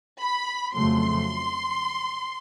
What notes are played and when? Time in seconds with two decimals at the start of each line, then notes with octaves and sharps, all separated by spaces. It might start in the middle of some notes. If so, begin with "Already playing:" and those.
0.19 B5
0.74 F2 C#3 F#3 A3 C6